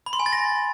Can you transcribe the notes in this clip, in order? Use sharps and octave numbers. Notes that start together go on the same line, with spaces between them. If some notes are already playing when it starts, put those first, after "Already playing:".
B5
C6
G#5
A6
A#6